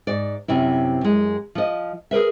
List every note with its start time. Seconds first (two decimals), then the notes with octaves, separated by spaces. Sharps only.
0.07 G#2 D5
0.48 F#2 C3 C#4 E4
1.01 F#2 G#3
1.55 F3 D#5
2.11 G#4 A#4 B4 E5